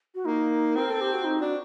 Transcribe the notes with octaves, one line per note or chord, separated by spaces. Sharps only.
F#4
A#3 D#4
C4 A#4
A4
G4
F#4
D#4
D4 F#4